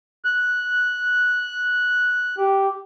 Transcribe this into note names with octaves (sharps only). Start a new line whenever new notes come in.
F#6
G4